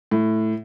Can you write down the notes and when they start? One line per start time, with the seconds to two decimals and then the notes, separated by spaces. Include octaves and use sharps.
0.11 A2